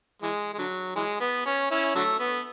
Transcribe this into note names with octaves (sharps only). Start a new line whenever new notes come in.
E3 G#3
G#3
D3 F#3
E3 G#3
B3
C#4
C#4 E4
D3 F#3 A3
B3